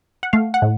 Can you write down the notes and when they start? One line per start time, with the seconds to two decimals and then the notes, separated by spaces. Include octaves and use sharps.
0.23 F#5
0.33 A3 F5
0.54 F#5
0.62 A2